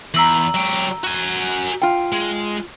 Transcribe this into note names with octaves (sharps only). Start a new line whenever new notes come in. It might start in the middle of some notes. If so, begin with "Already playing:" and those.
E2 A#5 E6 F#7
F#3 G4
F#4 G#5
F4 G5
G#3